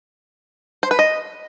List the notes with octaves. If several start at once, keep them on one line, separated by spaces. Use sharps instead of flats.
C5
B4
D#5